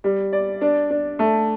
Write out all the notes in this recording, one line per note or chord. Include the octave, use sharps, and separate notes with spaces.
G3
D5
D4
D4
A3